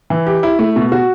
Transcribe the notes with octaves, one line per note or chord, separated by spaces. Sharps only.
E3
G4
E4
A3
B2
F#4